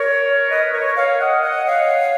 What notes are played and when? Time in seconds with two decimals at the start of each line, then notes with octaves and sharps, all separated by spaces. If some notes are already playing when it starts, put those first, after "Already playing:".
Already playing: A#4 C#5
0.50 B4 D#5
0.73 A#4 C#5
0.97 C#5 F5
1.20 D#5 F#5
1.43 D#5 F#5
1.67 C#5 F5